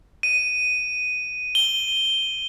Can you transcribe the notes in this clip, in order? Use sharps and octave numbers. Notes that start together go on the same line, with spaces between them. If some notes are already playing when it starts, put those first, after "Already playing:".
D#7
G7